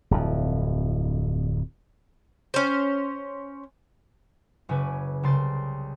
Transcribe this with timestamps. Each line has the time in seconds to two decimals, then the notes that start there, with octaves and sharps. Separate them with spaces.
0.11 D1 F2
2.54 C#4 C5
4.69 F#1 C#3 C#4 B4 G#5 D6
5.23 C2 C#3 G5 C6 A6